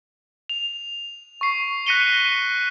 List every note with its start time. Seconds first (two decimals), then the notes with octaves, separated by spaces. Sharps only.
0.49 F7
1.41 C#6 C7
1.87 F#6 A#6 B6 C#7 D#7 G7